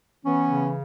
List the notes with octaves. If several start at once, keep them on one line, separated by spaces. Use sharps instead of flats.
E3 B3 C#4
C#3